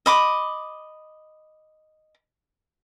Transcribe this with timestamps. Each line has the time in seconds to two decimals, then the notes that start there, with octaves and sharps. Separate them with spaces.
0.06 D#5 B5 D6